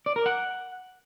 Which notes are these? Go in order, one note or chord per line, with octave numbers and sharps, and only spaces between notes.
D5
A#4
F#5